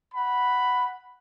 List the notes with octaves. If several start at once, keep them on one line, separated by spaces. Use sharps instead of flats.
F#5 B5